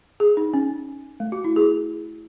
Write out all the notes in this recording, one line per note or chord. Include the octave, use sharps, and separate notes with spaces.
G#4
D#4
C#4
A3
F#4
E4
G#4